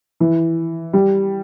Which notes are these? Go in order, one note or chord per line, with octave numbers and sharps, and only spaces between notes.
E3
G3